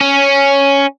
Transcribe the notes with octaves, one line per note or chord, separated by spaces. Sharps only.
C#4